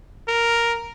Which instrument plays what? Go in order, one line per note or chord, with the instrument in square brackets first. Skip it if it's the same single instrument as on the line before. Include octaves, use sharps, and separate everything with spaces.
[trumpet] A#4